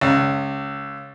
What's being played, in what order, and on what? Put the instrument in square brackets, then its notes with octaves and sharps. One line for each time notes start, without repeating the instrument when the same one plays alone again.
[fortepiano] C#2